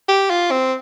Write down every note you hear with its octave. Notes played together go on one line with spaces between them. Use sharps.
G4
F4
C4